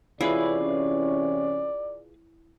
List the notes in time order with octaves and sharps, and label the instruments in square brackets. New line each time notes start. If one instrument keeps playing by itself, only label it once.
[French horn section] C3 E3 C#4 [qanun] E4 [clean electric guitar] F4 G#4 B4 [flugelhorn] D5